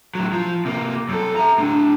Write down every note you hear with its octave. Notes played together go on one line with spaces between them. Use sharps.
A2 F#3
F3
C3 A#3
F#2 A4
E5 A#5
A2 D4